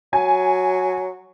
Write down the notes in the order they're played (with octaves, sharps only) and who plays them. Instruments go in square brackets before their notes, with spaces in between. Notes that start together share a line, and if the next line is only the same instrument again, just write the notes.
[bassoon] F#3 [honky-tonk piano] G#5